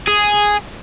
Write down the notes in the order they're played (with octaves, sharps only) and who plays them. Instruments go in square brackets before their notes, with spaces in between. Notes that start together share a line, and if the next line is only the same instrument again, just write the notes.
[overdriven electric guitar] G#4